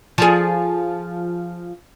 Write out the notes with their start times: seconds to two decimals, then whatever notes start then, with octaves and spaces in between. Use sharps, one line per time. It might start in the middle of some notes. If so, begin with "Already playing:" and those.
0.18 F3 G#4